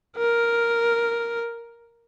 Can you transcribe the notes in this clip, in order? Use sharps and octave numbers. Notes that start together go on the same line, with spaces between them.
A#4